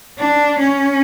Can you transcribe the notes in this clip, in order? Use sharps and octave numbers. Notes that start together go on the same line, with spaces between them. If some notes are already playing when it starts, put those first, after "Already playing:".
D4
C#4